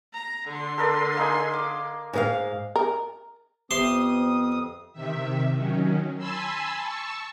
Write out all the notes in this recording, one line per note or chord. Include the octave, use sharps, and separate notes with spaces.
A#5
D3 C6
A4 A#4 D5
A#3 D#4 G#5
D6
G#2 A#4 F5
A#4
F2 B3 G4 C5 E5 C6 D#6
C3 D#3 E5
D#3 F#3 C#4
G#5 A5 B5 C6 E6
A5 C#6 E6